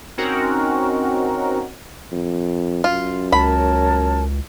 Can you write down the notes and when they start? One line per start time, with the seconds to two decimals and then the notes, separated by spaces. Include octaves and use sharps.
0.18 C4 C#4 D#4 F#4 A#4
2.12 F2
2.84 F#2 F4
3.32 C#2 A#4 C#5 A5 B5